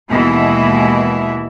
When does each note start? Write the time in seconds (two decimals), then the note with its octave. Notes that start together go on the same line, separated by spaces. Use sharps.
0.10 D#2 B2 E3 G#3 E4 E5